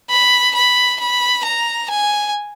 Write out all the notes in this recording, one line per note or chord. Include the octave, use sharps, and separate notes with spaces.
B5
B5
B5
A#5
G#5